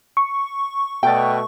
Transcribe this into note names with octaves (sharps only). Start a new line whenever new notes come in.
C#6
B2 A3 D5 G5